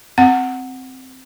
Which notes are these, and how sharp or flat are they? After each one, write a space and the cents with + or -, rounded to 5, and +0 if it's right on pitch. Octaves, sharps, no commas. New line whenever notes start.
C4 -5 F#5 +0